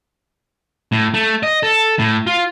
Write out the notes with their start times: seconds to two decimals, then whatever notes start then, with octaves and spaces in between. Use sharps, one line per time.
0.92 A2
1.14 A3
1.43 D#5
1.63 A4
1.99 A2
2.27 F4